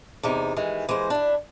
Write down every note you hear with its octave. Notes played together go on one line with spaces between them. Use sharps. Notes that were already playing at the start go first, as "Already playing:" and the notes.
E2 C3 D#4
D#3 E3 G#3
E3 G#3 A#3 C5
D4 E4